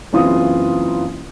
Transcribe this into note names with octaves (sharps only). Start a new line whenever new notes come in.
F#1 E3 C4 F4 D#6